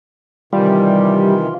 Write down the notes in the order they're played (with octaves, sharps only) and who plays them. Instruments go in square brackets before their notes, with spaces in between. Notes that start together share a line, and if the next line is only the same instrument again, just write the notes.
[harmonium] C3 D#3 E3 [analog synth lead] G3 [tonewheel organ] F4